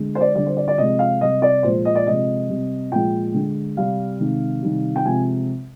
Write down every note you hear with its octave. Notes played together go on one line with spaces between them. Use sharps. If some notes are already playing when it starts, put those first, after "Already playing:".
Already playing: D3 G#3
C5
D5
D3 G3 D5
C5
D5
D5
C3 F3 G#3 D#5
F5
C3 G3 D#5
D5
A#2 F3 G#3 C5
D#5
D5
C3 F3 G#3 D#5
C3 G3
A#2 F3 G#3 G5
D3 G#3
C3 G3 F5
C3 D#3 G#3
C3 D#3 G3
G5
C3 F3 G#3 G#5